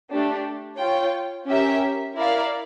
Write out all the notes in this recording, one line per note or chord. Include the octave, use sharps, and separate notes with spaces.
A3 D4 G4
F4 C#5 G5
C#4 G4 A#4 E5
E4 A#4 D5 F5